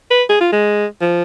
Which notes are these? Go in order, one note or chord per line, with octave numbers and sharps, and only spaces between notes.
B4
G#4
F4
G#3
F3